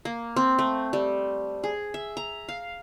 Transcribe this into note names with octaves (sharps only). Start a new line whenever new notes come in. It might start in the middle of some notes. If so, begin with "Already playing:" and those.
A#3
C4
A3
G3
G#4
E5
A#5
F5